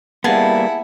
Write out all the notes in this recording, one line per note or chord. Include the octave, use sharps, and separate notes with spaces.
G3 A#3 B3 E4 G#4 F#5 A5